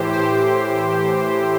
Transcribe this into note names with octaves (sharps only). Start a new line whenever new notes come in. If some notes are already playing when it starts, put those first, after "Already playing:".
Already playing: A2 E3 G4 C5
G4 C5